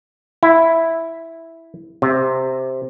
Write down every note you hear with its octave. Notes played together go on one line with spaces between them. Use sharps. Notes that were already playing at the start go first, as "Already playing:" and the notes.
E4
C3